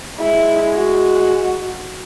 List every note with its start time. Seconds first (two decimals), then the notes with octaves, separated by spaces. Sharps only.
0.19 G#3 E4
0.76 F#4